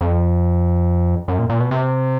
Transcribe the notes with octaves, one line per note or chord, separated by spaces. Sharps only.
F2
F#2
A#2
A#2
B2
C3